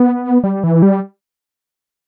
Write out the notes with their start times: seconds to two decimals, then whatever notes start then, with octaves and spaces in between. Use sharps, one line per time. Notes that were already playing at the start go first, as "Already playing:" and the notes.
Already playing: B3
0.44 G3
0.64 E3
0.82 G3